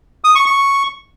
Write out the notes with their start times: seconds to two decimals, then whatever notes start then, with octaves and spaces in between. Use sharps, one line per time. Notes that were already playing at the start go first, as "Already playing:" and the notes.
0.24 D#6
0.35 C#6
0.46 C#6